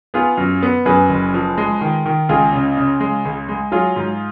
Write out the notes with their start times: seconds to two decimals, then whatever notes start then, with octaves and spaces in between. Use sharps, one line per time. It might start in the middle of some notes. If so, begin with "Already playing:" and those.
0.14 B3 F4 G#4
0.37 F#2
0.63 B3
0.85 F#2 G#4 B4
1.09 F#1
1.34 F3
1.58 G#3
1.81 D#3
2.06 D#3
2.29 C#2 F4 G#4
2.53 C#3
2.77 C#3
3.00 G#3
3.25 C#2
3.48 G#3
3.72 F#3 F4 G#4
3.96 G#2